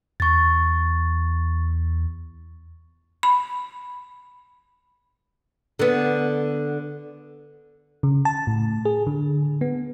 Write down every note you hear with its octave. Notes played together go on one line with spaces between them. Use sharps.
E2 C#6 A6
B5
D3 B3
C#3
A5
A2
G#4
D3
B3